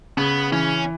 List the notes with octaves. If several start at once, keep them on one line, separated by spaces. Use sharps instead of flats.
C#3 B3
E3 C#4